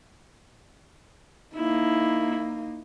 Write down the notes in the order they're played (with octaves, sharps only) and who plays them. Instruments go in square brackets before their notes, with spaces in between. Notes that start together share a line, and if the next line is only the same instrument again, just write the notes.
[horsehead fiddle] A#3 D#4 [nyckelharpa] E4